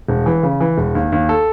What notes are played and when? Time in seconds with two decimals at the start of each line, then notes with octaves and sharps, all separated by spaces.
0.08 E1
0.26 E3
0.43 C#3
0.61 E3
0.78 E1
0.95 D#2
1.12 D#2
1.29 A4